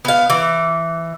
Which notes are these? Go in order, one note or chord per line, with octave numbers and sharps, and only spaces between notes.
B3 F5
E3